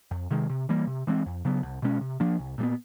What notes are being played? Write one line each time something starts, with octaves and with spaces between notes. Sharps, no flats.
F2
C3 D#3 G#3
C3
E3 G3 A#3
C3
E3 G#3 C4
F2
C#3 F#3 B3
C2
B2 G#3 C#4
C3
F3 A#3 D4
C2
A#2 G3 B3